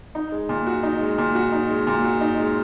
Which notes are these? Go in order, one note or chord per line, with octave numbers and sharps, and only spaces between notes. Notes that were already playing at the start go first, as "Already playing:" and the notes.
D#4
G#3
A#2
F#4
D#4
G#3
A#2
F#4
D#4
G#3
A#2
F#4
D#4
G#3